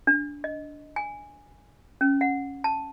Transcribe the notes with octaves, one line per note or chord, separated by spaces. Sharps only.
D4
D#5
G#5
C#4
F#5
A5